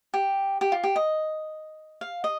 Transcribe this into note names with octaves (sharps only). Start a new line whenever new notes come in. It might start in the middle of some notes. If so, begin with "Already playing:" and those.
G4
G4
F4
G4
D#5
F5
D#5